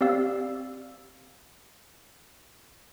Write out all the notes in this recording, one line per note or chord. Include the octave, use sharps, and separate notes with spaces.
C4 G4 D5 F5 E6